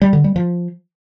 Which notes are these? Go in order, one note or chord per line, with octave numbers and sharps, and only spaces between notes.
G3
D3
G3
F3